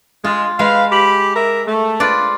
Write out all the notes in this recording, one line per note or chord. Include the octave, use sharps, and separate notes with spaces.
G#3 F4
G#3 B4 F5
G4 B5
A#4 E5
A3
F4 B4 D5